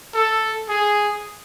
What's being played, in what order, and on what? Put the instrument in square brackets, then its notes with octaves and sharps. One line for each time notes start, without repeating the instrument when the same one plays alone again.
[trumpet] A4
G#4